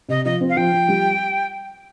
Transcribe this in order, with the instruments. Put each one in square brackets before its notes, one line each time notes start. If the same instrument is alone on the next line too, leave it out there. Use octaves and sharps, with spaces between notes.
[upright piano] C3 [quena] D#5
[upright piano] F3 [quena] D#5
[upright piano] C4
[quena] F5
[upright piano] F3 [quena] G5
[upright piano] F3
G3